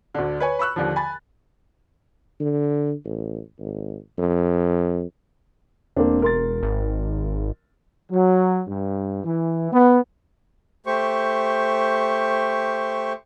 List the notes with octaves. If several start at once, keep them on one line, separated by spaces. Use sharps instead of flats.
D2 D3
B4 C#5 G#5
B5 C#6 E6 F#6
D#2 D3 F3
G#5 B5 A6
D3
A1
G#1
F2
E1 A#3 C4 D4
A#4 C6 A6
G#1
F#3
G2
E3
B3
A3 G4 C5 C#6